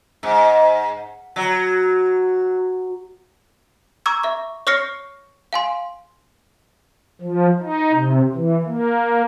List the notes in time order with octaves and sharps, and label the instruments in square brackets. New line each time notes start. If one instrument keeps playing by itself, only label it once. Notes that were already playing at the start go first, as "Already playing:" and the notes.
[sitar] G#2
F#3
[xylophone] A#5 C#6 D6 E6 G#6
E5 C#6
C#5 C#6 F6 A#6 C7 C#7
F5 G#5 C6
[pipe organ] F3
D#4
C3
E3
A#3